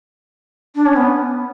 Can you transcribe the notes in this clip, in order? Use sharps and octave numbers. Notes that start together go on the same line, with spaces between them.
D4
C#4
B3